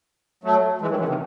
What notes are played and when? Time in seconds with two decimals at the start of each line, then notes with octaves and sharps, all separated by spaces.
0.44 F#3 A3
0.81 E3 G#3
0.90 D#3 F#3
0.99 C#3 E3
1.08 C3 D#3